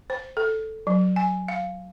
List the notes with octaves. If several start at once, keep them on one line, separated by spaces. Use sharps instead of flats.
C5
A4
F#3
G#5
F5